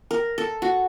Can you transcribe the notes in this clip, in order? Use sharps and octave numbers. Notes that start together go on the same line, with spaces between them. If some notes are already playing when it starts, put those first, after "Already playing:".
A#4
A4
F#4